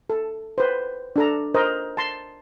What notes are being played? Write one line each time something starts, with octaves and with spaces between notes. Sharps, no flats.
A4
B4 C5
D4 A4 A#5
A#4 C5 D#5
A5 C6